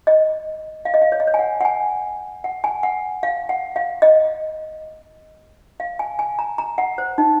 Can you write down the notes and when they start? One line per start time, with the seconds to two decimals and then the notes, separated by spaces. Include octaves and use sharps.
0.07 D#5
0.85 F5
0.94 D#5
1.02 F5
1.12 C#5
1.20 D#5
1.27 C#5
1.34 G#5
1.39 F#5
1.61 F#5
1.65 G#5
2.44 F#5
2.64 G#5
2.83 F#5
3.23 F5
3.49 F#5
3.76 F5
4.02 D#5
5.80 F5
5.99 G#5
6.19 G#5
6.39 A#5
6.58 A#5
6.78 F#5
6.98 C5
7.18 D#4